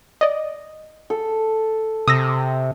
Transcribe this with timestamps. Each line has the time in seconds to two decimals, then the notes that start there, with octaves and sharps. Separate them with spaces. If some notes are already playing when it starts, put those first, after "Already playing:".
0.21 D5 D#5
1.10 A4
2.08 C3 D#6 E6 A#6